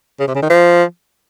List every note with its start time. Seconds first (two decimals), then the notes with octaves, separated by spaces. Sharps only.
0.20 C#3
0.27 C3
0.35 C#3
0.42 D#3
0.50 F3